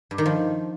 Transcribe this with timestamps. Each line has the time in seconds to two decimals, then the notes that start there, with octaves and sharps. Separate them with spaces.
0.11 G2
0.18 D#3
0.26 F3